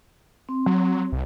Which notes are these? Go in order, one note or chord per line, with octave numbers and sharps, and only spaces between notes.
C4
F#3
C2